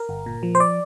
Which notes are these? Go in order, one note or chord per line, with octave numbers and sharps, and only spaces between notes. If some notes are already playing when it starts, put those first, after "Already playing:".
Already playing: A#4
G1
A#2
F3
C5
D5